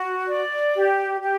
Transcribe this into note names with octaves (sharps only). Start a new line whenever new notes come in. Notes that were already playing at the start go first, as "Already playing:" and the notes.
Already playing: F#4
D5
G4
G4